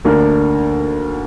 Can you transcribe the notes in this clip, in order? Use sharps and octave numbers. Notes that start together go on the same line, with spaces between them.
D2 D3 A#3 D4 A#4